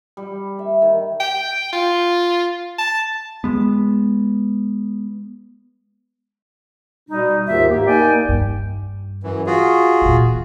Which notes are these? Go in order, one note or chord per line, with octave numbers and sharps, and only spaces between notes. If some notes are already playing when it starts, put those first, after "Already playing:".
G3
E5
D#3
G5
F4
A5
G#3 B3
B2 G3 D#4
D#2 G#2 D#3 F4 G4 E5
A#3 G4
A#3 D#4 A#4 D5 G5 G#5
G2
F#2 E3
F4 F#4 G#4
E2 A#2